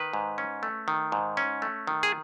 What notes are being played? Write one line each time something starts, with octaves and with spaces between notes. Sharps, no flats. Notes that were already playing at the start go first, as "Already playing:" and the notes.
Already playing: D#3 B4
G#2
C#4
A3
D#3
G#2
C#4
A3
D#3
G#4